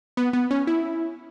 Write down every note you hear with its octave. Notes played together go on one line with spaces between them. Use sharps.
B3
B3
C#4
E4